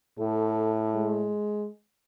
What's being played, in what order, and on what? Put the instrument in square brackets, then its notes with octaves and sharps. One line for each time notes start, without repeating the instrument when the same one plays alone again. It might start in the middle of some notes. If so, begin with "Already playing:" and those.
[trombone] A2 [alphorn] A4
[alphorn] G#3